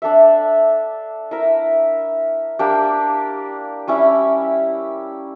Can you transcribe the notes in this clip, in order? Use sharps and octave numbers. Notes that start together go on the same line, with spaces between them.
D4 A4 E5
E4 A#4 E5
A#3 D4 G4
G3 C#4 E4